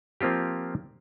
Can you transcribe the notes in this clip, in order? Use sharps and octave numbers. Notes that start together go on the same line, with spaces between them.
F3 A#3 C4 F4 G4